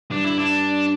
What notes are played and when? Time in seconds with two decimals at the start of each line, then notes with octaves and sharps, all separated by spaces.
0.11 G2 D4
0.24 E4
0.38 D4